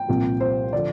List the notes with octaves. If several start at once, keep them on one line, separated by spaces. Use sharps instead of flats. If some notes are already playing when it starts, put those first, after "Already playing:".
Already playing: G5
C2 A#2 F3
C5
D3 F3 D5